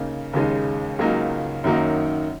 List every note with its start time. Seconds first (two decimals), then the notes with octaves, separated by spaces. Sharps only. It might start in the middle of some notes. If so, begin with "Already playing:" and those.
Already playing: C#3 A#3 D#4
0.33 D#2 C#3 G#3 D#4
0.99 C#2 C#3 F#3 A#3 D#4
1.64 F#2 D#3 F#3 A#3 D#4